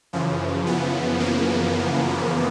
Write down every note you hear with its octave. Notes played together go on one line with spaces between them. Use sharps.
F#2 C#3 E3 F3
B3
A#3